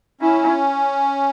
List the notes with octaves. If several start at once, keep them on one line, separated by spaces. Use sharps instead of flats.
C#4 E4